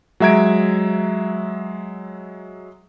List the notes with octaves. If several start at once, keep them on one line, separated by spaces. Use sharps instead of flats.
F#3 G#3 E5 A#5 G#6 D7